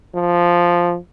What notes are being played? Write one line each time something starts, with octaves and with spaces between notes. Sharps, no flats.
F3